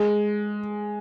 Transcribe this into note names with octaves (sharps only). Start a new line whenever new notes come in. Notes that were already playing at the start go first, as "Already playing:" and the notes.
Already playing: G#3